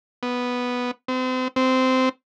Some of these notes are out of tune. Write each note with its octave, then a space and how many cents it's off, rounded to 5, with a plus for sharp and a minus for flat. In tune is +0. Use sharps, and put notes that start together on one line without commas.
B3 -5
C4 -35
C4 -15